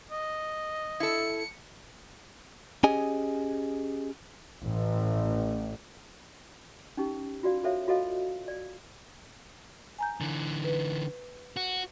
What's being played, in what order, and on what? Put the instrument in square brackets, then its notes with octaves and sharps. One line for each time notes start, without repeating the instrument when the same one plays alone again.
[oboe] D#5
[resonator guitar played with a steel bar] E4 A4 [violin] C#7
[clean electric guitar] C#4 G4 G#4 D#5 G#5
[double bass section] A1
[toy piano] C#4 D#4 G4
F4 F#4 D5 F5
F#4 A4 C5 C#5 E5 F5
F4 F#4 A4 D#5 F5
D5
[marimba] G#5 A#5 G6
[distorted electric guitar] D3 E3
[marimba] B4
[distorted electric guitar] F#4